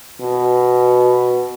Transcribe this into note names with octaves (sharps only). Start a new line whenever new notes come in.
B2